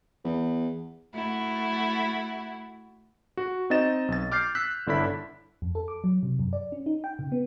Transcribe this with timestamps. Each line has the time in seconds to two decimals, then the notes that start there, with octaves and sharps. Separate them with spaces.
0.24 E2
1.14 A3 E4 F#4
3.37 F#4
3.70 C4 D#4 D#5 A6 E7
4.08 B1 A6
4.32 D6 F6 G6 A6 C7
4.55 E6 F#6 B6
4.87 G1 D3 D4 E4 B5 B6
5.62 F2
5.75 A4
5.88 D6
6.04 F#3
6.23 C3
6.39 F#2
6.53 D5
6.72 C#4
6.86 D#4
7.04 G5
7.19 C#3
7.32 B3